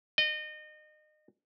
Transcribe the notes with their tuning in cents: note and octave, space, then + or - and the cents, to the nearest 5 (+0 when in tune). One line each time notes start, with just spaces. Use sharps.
D#5 -30